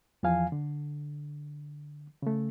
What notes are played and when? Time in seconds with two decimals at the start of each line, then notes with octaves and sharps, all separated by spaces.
0.23 E2 E3 F3 F5 G#5
0.52 D3
2.22 C#3 A3